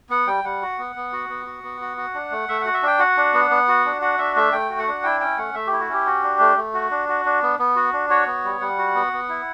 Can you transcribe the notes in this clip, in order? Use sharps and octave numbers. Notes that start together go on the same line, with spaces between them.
B3 F#5
G3 G5
G3 F#5
F#4
B3
B3
F#4
B3
F#4
B3
F#4
F#4
D4
A3
A3 E5
F#4 F#5
E5
D4 G5
F#4 F#5
D4
B3
B3
F#4
D4
F#4 F#5
D4 E5
A3 E5
A3 G5
F#4
F#5
D4
E4 G5
C#4 G5
A3 F#5
A3 E5
G4
E4
F#4
C#4 G4
F#4
D4
A3
A3
F#4
D4
F#4
D4
B3
B3
F#4
D4
F#4 C#5
B3
G3
G3 F#5
F#4
B3
B3
E4